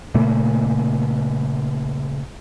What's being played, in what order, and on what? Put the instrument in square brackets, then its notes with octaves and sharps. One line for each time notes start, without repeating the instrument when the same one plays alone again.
[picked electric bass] A#2 C#3 A3 A#3